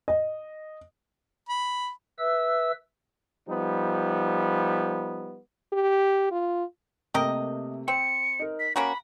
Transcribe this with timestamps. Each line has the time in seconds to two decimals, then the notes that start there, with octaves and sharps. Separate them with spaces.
0.08 D#5
1.49 B5
2.19 B4 E5 E6
3.48 F3 G3 B3 D#4
5.73 G4
6.32 F4
7.14 C3 A3 A#3 G4 A#4 D#5
7.88 C4 C5 C#7
8.39 D#4 A#4
8.60 B6
8.76 A#3 C#4 F#4 A#5 B5